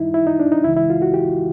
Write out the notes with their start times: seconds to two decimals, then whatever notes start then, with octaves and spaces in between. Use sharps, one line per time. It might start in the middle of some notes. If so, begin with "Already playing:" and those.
Already playing: F#2 D#3 G3 D#4 E4
0.14 E4
0.27 D#4
0.40 D4
0.52 D#4
0.64 C#2 C#3 E3 G#3 E4
0.76 E4
0.90 F4
1.02 F#4
1.14 G4